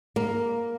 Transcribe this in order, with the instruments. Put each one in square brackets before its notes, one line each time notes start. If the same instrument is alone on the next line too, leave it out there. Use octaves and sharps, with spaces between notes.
[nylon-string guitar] A#3